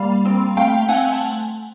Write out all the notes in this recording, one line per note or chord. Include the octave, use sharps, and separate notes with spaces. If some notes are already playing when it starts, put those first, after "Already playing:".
Already playing: G3 A#3 F5
C4
A3 F5 G5
C4 F#5 G#5
A5